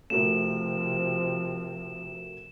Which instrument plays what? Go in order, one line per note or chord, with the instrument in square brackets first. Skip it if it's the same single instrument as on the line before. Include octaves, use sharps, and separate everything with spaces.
[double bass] C3 F3 [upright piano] A3 F#4 A#4 [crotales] E7